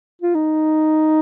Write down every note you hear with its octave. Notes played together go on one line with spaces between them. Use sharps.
F4
D#4